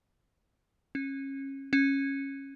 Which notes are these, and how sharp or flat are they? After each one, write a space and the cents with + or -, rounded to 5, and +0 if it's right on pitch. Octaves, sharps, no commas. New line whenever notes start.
C#4 -25
C#4 -15